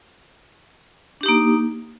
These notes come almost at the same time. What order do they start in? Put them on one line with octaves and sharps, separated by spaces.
D4 G4 D#4 A#3